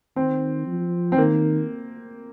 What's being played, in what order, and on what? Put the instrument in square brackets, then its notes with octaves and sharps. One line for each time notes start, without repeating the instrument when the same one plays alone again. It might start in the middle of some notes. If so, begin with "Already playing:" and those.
[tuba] D#3 [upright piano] C4
[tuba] F3
[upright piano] C4
[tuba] D#3 [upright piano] A#3